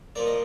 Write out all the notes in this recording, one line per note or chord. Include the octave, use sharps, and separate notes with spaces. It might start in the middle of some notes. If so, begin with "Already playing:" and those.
A#2 F3 A#3 D5
D#5